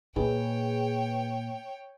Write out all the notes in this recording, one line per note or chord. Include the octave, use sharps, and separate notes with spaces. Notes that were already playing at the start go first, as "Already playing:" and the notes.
A#2 D#4 G#4 B4 C#5 G5